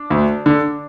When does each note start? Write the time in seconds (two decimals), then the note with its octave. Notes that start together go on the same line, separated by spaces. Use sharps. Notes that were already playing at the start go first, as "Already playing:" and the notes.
Already playing: D4
0.10 D2
0.46 D3